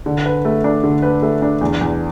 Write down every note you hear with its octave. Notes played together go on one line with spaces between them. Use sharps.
D3
B4
A3
D4
D3
B4
A3
D4
E2
E2